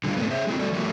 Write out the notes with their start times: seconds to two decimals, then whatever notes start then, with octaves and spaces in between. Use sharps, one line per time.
0.04 D3 G3 G#3 F4
0.17 G#2 C3 A3 B3
0.30 G#4 C5 E5
0.47 G#3 A3 C4 E4 F#4
0.59 G3 F#4 A4 D5
0.72 F3 G3 A3 A#3 F#4 G4